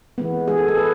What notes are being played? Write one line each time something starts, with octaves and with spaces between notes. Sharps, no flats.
E3 G#3 B3
E3 G#3 B3 G#4
A4
A4
E3 G#3 B4